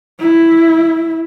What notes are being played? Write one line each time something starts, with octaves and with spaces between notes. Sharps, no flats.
E4